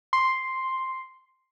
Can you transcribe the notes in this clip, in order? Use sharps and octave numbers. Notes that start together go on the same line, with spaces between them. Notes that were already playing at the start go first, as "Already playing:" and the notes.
C6